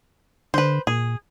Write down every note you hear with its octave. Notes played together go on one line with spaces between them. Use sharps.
D3 B4 C5
A#2 G#4